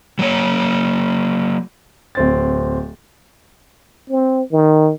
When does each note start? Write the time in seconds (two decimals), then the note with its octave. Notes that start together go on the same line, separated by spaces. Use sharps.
0.19 F#3 A#3 C#5
2.15 D1 C4 A6
4.10 C4
4.52 D#3